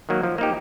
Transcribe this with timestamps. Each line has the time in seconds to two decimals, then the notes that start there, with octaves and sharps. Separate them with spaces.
0.09 D#3 F#3 A#3
0.23 F3
0.38 A#3 D#4 G4